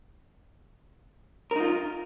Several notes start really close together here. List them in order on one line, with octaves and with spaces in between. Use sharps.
A#4 D#4 F4